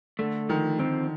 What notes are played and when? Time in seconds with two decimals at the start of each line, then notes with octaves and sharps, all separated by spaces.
0.19 D3 A3
0.49 D#3 F3
0.79 D#3 C4